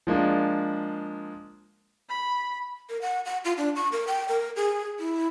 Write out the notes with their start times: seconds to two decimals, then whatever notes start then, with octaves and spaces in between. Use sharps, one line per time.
0.07 F3 G#3 A#3 D4
2.09 B5
2.90 A#4
3.02 F#5
3.26 F#5
3.45 F4
3.58 D4
3.76 C#6
3.92 A#4
4.07 G5
4.29 A#4
4.56 G#4
4.99 E4